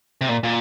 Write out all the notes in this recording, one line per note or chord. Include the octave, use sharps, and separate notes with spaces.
C3
A#2
A#2